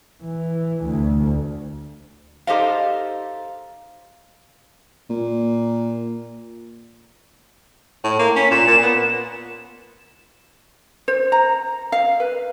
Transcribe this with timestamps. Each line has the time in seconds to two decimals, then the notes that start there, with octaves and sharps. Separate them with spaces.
0.23 E3
0.85 D2
2.47 D#4 G4 A4 C5 D#5 F5
5.10 A#2
8.04 A2
8.19 A#3
8.36 C#4 B6
8.51 A#2 E7
8.68 A#2
8.83 B3
11.08 C5
11.32 A#5
11.92 F5
12.20 B4